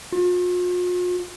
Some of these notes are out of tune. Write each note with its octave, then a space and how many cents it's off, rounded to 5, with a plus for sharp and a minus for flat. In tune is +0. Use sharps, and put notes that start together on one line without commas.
F4 +45